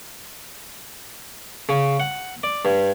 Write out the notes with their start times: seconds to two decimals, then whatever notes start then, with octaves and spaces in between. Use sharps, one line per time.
1.69 C#3
2.00 F#5
2.43 D5
2.65 G2